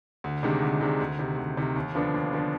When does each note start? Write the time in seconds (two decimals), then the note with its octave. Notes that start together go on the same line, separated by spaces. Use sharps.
0.24 D2
0.43 C3 D#3 G#3 D4
0.62 D2
0.81 C3 D#3 G#3 D4
1.00 D2
1.19 C3 D#3
1.37 D2
1.57 C3 D#3
1.76 D#2
1.95 D3 F3 B3 D4
2.14 D#2
2.33 D3 F3 B3 D4